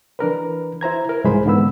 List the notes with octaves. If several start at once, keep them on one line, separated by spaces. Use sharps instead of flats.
E3 D4 A#4 B4
E4 C5 A#5 G#6
A#4
C2 G#2 E3 G#4 C5 B5
G#2 D3 A#3 B3 B5 E6